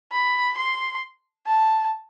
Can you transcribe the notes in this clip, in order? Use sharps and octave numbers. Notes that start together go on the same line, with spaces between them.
B5
C6
A5